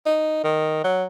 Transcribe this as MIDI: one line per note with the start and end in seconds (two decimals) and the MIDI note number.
0.06 0.40 63
0.44 0.83 51
0.84 1.04 54